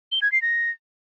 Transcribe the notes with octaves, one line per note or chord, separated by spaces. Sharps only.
G7
G#6
C7
A#6